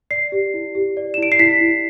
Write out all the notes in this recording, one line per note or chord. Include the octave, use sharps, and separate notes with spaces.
D5 C7
G4
E4
G4
D5
E7
E4 D7
C7
E4 B6
E4